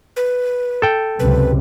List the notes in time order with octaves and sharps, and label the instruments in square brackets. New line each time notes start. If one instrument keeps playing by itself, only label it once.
[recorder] B4
[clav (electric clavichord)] A4 G5
[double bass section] C#2 F#2 C3 [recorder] B4